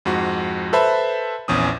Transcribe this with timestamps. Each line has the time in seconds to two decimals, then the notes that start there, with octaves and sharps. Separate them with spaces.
0.05 F2 G#2 F#4
0.73 A4 B4 C5 E5 A5 B5
1.48 A#1 E2 C#4 D#6